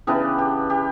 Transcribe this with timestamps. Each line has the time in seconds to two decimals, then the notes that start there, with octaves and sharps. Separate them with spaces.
0.07 C#3 E3 B3 D4 G4
0.38 G4
0.70 G4